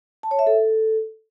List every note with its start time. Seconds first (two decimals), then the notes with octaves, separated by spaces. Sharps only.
0.23 A5
0.31 C#5
0.39 E5
0.47 A4